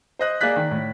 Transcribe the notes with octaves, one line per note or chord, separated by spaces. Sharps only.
C5 D#5 F#6
A#3 G#4 D5 F#6 B6
D#3
A2